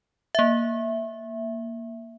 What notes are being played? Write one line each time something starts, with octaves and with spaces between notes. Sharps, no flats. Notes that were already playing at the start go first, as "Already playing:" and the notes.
A#3 E5